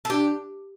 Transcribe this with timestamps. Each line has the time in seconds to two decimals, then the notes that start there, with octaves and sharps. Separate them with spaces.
0.05 A4
0.10 D4 G4